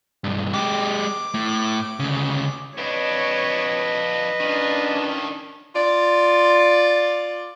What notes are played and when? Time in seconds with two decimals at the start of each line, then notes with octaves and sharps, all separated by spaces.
0.24 B1 G2
0.53 G#3 G4 D6
1.34 A2
2.00 D2 C#3
2.78 F2 D4 B4 C#5 D#5
4.40 D#3 C#4 D4 F4
5.75 F4 D5